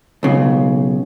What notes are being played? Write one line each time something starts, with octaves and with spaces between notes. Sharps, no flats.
B1 C#3